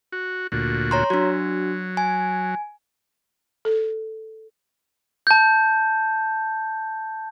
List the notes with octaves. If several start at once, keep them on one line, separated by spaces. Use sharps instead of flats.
F#4
D2 A#2 F#4
C#5 A#5 C6
F#3 D4 F#4
G#5
A4
A5 G6